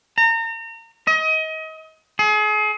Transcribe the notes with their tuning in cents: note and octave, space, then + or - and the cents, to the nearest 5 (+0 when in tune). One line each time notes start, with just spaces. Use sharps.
A#5 -35
D#5 +30
G#4 +35